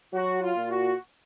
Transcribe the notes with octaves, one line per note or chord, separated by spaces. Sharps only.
F#3 F#4
F4
A#2
F#4